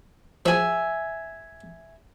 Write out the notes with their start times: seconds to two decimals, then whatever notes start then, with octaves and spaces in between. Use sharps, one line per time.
0.46 F3 F#4 G#4 E5 G#5